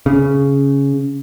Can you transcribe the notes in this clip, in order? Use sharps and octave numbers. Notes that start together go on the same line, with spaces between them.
C#3